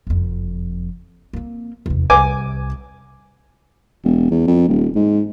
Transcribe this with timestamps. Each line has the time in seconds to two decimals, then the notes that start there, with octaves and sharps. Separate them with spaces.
0.07 F#1 F2
1.33 A#3 C4
1.86 F1 E2
2.10 C2 G#5 D6
4.04 E1
4.31 E2
4.47 F2
4.68 D#1
4.96 G#2